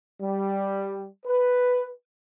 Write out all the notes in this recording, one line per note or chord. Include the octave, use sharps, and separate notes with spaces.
G3
B4